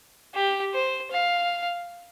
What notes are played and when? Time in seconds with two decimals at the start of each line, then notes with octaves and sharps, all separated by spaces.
0.34 G4
0.73 C5
1.11 F5